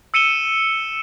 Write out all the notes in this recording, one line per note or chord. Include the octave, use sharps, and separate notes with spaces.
E6 C#7 D#7 E7 G7